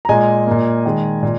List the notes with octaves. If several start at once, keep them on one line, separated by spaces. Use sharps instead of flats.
A#5
A#2 G#3 D#5 G#5
A#2 A#3
D#3 G#3
A#2